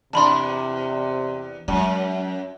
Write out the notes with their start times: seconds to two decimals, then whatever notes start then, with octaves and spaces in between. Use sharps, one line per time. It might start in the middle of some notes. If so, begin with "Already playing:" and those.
0.13 E2 C3 D4 A5 B5 C6
1.68 F#2 F#3 G#3